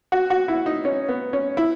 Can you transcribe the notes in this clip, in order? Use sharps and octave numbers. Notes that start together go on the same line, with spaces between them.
F#4
F#4
E4
D#4
C#4
B3
C#4
E4